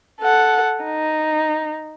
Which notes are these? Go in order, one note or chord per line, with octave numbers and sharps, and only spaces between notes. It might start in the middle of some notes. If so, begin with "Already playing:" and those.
A4 F#5
D#4